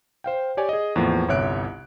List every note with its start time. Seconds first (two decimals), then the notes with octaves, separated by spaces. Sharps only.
0.24 C5 F5 G5
0.57 G4 C#5 D5 G#5
0.69 G#4 D#5
0.96 E2 A2 F3 A#3
1.28 G1 C2 C#5 E5 F#6 D7